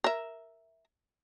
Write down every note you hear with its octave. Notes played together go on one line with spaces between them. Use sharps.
A#4 E5